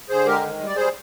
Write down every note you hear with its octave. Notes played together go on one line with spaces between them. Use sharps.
D3 G#4 C5
G#3 G4 A#4
D#3
G3
D5
G3 G#4 C5